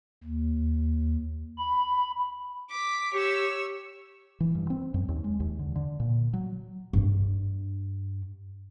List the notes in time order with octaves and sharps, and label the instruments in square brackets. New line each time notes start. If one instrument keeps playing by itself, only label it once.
[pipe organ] D#2
B5
[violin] D6 B6
[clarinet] G4 [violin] C#5 E6
[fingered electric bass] E3
G2
C4
F#2
D#2
G#3
D#2
D3
D3
A#2
F#3
[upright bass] G2 D4